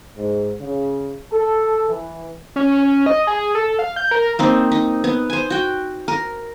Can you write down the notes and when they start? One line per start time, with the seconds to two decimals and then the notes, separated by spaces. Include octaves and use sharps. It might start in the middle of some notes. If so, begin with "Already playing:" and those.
0.16 G#2
0.60 C#3
1.32 A4
1.89 E3
2.56 C#4
2.78 C#4
3.06 D#5
3.27 G#4
3.55 A4
3.79 F5
3.96 G6
4.11 A#4
4.39 A#3 C4 D#4
4.72 D#4
5.04 B3
5.30 C5 G#5
5.50 F#4 G5
6.08 A#4